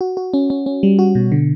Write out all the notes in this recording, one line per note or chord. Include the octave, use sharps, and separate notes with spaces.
F#4
F#4
C#4
C#4
C#4
G3
F#4
B2
D3